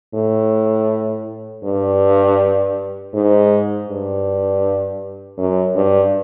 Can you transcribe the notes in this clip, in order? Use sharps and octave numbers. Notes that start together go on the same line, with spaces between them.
A2
G2
G#2
G2
F#2
G2